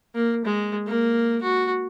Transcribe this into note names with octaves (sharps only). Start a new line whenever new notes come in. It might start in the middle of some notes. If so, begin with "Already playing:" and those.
A#3
G#3
A#3
F#4